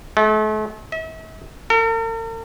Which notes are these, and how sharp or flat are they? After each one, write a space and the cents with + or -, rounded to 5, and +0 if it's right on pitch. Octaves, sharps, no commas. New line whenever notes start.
A3 -40
E5 -40
A#4 -45